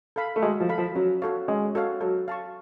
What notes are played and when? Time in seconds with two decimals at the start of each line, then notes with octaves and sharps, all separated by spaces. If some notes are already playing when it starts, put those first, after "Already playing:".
0.16 A4 F5 B5
0.36 A3
0.42 G#3 F#4
0.60 F3
0.69 A4 F5 B5
0.78 F3
0.95 F#3 C#4
1.22 F#4 A4 C#5 F5
1.48 G#3 C#4
1.75 F#4 A4 C#5 F5
2.01 F#3 A4
2.28 F5 A5 C#6